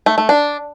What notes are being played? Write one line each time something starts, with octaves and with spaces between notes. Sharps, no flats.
A3
A3
D4